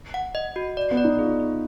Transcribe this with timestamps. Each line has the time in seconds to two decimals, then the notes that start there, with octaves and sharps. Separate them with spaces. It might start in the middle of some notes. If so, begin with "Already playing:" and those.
0.14 F#5
0.35 D#5
0.56 F#4
0.77 D5
0.91 B3
0.97 D5
1.04 D#4
1.19 F4 G#4
1.40 G#4